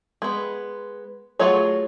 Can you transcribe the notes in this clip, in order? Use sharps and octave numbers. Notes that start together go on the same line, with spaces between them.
G#3 B3
F#3 A3 F4 G#4 C#5